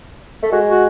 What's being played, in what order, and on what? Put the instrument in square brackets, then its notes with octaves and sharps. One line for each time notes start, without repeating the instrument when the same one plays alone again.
[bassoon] A3
[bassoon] G#3 [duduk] F#4
[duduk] F#4